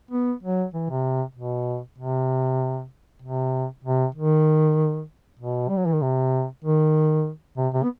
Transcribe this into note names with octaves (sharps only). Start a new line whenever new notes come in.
B3
F#3
E3
C3
B2
C3
C3
C3
D#3
B2
G3
F#3
E3
D#3
C3
D#3
C3
C3
B3